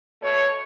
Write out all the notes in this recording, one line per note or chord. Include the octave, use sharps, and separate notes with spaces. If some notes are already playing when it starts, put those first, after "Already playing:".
B2 A3 C#5